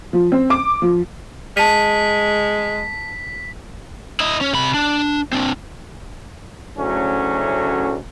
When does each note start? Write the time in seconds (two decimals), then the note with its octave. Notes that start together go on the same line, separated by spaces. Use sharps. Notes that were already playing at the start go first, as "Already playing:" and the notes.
0.13 F3
0.32 C4
0.50 D6
0.82 F3
1.57 G#3 A5 B6 D#7
4.20 E4 D#5
4.41 C#4
4.53 C3 B5
4.74 D4
5.33 C4 D4
6.78 D2 A2 C#3 F#3 A3 C#4